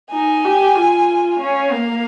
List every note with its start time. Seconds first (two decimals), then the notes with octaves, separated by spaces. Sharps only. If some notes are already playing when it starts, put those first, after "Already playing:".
0.12 D#4 G#5
0.45 G4
0.76 F4
1.40 C#4 F5
1.73 A#3